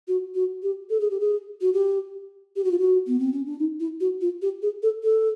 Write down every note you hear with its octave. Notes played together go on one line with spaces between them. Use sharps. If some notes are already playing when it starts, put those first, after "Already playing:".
F#4
F#4
G4
A4
G#4
G4
G#4
F#4
G4
G4
F#4
F4
F#4
B3
C4
C#4
D4
D#4
E4
F#4
F4
G4
G#4
A4
A4